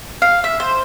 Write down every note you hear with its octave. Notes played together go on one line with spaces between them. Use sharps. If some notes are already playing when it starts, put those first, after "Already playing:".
F5
E5
C5